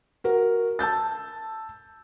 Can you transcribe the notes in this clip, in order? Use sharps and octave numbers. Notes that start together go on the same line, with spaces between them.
F#4 A#4
A5 E6 G6 A6